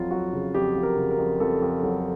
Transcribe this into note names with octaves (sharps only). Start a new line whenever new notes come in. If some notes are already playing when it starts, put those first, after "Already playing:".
Already playing: F2 F#3 F4
F#3 F#4
C#3
F2 G4
F2
A#4
C#3
A#4
F2
F2 A4
F2
F#3